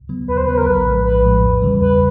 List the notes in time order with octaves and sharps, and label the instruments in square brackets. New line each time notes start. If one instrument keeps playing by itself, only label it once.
[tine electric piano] C#3 F#3 B3
[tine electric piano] D#2 [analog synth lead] B4
[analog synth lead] C5
[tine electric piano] C#3 F#3 B3 [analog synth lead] B4
[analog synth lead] A#4
[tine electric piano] A#1 [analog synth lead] B4
[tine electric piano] A2 F3 G#3
[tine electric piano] A#1 [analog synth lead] B4
[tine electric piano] A2 F3 G#3
E2
C#3 E3 G3
[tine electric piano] E2 [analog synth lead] B4